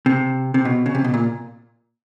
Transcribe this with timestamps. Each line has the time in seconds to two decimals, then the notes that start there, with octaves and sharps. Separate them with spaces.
0.06 C3
0.54 C3
0.65 B2
0.86 C#3
0.95 C3
1.04 B2
1.14 A#2